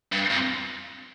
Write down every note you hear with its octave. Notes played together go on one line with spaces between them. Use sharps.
G2
F2